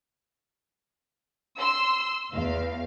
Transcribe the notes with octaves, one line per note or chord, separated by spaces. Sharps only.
C6 E6
E2 F5